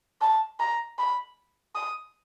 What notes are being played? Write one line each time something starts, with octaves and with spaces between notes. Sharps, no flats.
A5
A#5
B5
D#6